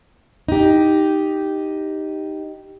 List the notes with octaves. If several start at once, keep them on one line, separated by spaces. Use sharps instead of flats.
D#4 G4